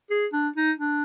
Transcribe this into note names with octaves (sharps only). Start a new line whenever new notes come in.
G#4
D4
D#4
D4